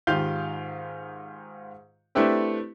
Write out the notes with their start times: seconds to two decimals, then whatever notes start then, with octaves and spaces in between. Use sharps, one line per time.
0.07 G#2 D#3 F4 G4 F5 G6
2.15 A3 C4 D4 E4 G4 B4